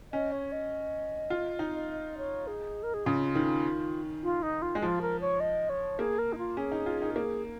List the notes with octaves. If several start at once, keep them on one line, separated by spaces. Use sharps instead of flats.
C#4 D#5
C#5
D#5
F4
D#4
D#5
C#5
G#4
A#4
G#4
C#3 F4
D#3
F4
D#4
F4
G#3
F3 F4
A#4
C#5
D#5
C#5
A#3 G#4
A#4
D#4
F4
C#4 G#4
D#4
F4
D#4
A#3 G#4